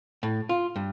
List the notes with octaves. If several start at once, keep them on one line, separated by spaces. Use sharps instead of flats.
A2
F4
G2